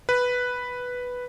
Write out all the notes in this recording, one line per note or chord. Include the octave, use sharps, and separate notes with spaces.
B4